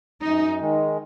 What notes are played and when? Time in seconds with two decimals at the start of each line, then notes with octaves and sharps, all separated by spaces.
0.23 F#2 D#4
0.61 D#3 G#3